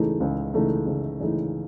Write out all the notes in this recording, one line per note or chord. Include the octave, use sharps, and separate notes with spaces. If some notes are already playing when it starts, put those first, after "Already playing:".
Already playing: C#2 C#3 E3 A3 D#4
C#2
C#3 E3 A3 D#4
C#2
C#3 E3 A3 D#4